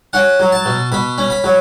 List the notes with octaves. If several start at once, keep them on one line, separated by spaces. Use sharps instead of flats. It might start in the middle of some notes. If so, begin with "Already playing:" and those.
C#4 F#5
F#3
A5
B2
B2 B5
C#4
B5
F#3